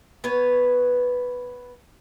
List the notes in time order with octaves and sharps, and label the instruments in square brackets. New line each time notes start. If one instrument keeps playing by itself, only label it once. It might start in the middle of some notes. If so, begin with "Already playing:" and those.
[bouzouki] B3 B4 C#5